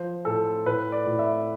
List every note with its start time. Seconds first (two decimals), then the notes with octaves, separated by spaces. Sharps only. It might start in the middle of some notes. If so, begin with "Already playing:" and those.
Already playing: F3 C5
0.25 A2 A4
0.66 A2 B4
0.92 D5
1.06 A2
1.19 E5